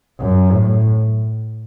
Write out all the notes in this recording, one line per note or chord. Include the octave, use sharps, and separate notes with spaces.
F#2
A2